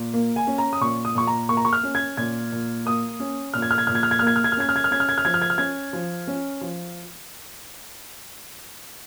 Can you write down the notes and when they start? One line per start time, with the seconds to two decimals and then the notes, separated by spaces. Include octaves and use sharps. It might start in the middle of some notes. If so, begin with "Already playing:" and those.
Already playing: A#2
0.14 A#3
0.36 G#5
0.47 C#4
0.58 A#5
0.73 D#6
0.81 A#2 C#6
1.05 D#6
1.15 A#2 C#6
1.27 A#5
1.49 A#3 C#6
1.57 A#5
1.65 C#6
1.73 F6
1.83 C#4
1.95 G#6
2.17 A#2 G#6
2.52 A#2
2.85 A#3 D#6
3.20 C#4
3.54 A#2 F6
3.62 G#6
3.71 F6
3.78 G#6
3.87 A#2 F6
3.95 G#6
4.03 F6
4.11 G#6
4.19 A#3 F6
4.27 G#6
4.36 F6
4.44 G#6
4.52 F6
4.57 C#4 G#6
4.69 F6
4.76 G#6
4.84 F6
4.91 C#4 G#6
5.00 F6
5.09 G#6
5.18 F6
5.25 F3 G#6
5.34 F6
5.42 G#6
5.50 F6
5.58 C#4 G#6
5.93 F3
6.27 C#4
6.61 F3